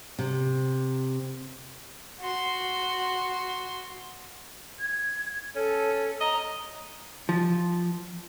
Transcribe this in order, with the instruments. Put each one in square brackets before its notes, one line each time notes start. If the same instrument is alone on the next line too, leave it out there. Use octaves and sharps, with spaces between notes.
[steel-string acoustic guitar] C3
[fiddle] F#4 C6
[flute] G#6
[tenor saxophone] C#4 [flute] A4
[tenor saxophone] D#5 [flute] A#5
[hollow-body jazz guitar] F3